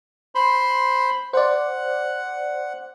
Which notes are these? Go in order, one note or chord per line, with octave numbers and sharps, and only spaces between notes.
C5 B5 C6
C5 D5 F#5